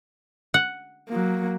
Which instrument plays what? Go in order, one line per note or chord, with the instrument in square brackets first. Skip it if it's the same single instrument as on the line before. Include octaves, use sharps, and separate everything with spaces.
[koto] F#5
[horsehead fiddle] F#3 A#3